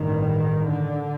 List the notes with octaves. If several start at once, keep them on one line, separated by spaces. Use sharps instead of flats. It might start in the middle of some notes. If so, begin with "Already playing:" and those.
Already playing: A1 G2 D#3
D3